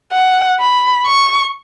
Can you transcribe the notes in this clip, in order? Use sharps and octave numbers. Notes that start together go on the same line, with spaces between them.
F#5
B5
C#6